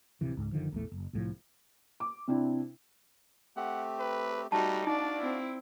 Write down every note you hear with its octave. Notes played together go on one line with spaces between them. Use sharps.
D1 C3 E3
C#2 G#2
F#1 D3 D#3 F3
A#1 E2 A3
F#1
C2 A2 F3
D6
C3 C4 D4 E4
A3 C4 G4 F#5
B4
G3 A3 D#4 F#4 A5 C#6
D4 D#4 F#4 D5 F5
C4 E4